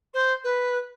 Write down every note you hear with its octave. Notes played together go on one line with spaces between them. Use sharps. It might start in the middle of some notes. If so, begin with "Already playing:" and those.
C5
B4